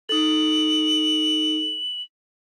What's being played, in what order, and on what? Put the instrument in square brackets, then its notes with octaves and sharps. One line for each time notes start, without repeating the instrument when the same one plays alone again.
[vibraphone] D#4 A4 [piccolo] F#7